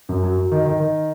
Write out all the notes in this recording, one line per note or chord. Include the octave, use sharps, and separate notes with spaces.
F#2
F#3
F#3
D#3
D#3
D#3